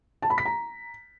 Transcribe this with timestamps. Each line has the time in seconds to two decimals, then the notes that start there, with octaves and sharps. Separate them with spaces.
0.22 A5
0.30 B5
0.38 B6
0.45 A#5